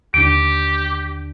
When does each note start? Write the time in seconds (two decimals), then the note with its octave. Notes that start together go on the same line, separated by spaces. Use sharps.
0.14 D#2 D3 D4 G4 D7